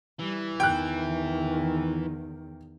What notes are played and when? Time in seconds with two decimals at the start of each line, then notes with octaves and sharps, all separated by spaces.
0.19 E3 G3
0.60 E2 D#3 G5 F#6